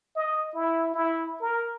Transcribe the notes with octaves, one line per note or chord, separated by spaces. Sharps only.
D#5
E4
E4
A#4